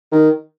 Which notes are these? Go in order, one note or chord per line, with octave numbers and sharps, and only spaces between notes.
D#3